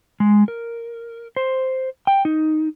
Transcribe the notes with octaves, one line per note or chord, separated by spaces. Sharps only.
G#3
A#4
C5
G5
D#4